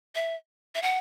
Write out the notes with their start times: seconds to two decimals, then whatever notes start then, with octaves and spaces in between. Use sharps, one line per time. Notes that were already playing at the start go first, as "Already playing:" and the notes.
0.15 E5
0.75 E5
0.82 F#5